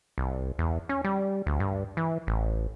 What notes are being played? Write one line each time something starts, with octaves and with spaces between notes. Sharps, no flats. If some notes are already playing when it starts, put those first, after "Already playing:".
C2
E2
C#4
G3
D2
G2
E3
A1